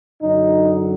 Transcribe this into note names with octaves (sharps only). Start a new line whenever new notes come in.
F#2 D3 F#3 D#4